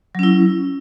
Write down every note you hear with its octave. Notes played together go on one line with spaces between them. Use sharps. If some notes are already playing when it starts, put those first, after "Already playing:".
F#3 C#4 E4